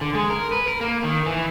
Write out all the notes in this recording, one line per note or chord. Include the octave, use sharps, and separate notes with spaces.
D3
G#3
A#4
B4
A#4
A#3
D#3
E3